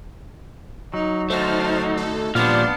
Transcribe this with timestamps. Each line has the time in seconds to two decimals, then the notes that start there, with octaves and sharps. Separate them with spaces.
0.94 F#3 D#4
1.30 A3 D#4 F#4 C5 A5 F6
1.97 A4
2.35 A#2 F3 G3 B3 D4 D5 F5 C6